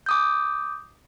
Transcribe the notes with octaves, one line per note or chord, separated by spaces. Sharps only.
D6 D#6 G6